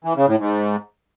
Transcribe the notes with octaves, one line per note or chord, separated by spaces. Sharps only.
E3
C#3
A2
G#2